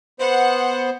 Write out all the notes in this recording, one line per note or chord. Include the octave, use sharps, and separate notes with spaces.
B3 C5 F#5